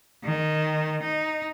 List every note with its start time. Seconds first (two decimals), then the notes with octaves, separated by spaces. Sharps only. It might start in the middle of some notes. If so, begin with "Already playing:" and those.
0.24 D#3
1.03 D#4